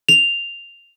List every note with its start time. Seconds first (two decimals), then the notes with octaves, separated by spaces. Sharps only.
0.09 F7